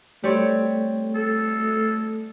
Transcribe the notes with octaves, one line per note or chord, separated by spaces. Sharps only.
G3 A3 C4 C#5
A4